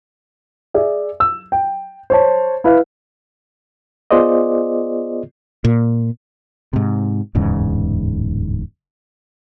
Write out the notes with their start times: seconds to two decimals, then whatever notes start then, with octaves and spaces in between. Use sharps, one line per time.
0.74 G#4 D5 E5
1.20 E6
1.52 G5
2.10 C5 C#5 A5
2.64 E4 B4 F5
4.11 B3 F4 G#4 C5 D5 D#5
5.65 A#2
6.73 G#2 C3
7.35 D1 E2 G#2 C#3